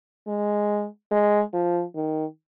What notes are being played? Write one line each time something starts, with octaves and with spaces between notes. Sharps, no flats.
G#3
G#3
F3
D#3